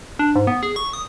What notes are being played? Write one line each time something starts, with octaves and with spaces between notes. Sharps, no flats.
D4
G#2
B3
G#4
C#6
D#6